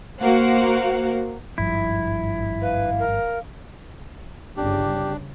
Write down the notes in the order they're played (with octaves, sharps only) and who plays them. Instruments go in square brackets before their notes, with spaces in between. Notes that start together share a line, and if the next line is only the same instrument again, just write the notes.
[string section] A#3 F#4 A#4 C5 F5 F#5
[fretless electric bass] G#1 G2 F3 [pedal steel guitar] E4
[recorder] B4 [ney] F5
[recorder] A#4
[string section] G1 C#3 [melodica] D4 [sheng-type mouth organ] G4